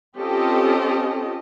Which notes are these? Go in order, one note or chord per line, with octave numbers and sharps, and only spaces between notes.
C4 C#4 F4 G4 A4 D#5